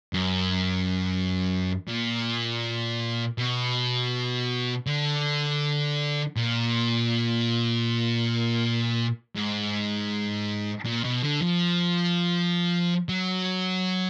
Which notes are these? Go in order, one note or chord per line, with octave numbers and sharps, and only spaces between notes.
F#2
A#2
B2
D3
A#2
G#2
A#2
B2
D3
F3
F#3